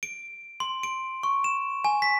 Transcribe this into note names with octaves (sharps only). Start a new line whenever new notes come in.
D7
C6
D7
C#6
E7
G#5
B6